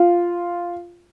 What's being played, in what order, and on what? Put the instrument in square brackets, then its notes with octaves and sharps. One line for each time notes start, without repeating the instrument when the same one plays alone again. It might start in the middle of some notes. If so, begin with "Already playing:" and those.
Already playing: [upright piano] F4